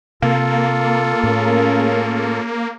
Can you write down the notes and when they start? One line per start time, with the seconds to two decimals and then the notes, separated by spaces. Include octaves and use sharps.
0.22 C3 A#3 F4 A4
1.23 A2 C#4 G#4 A#4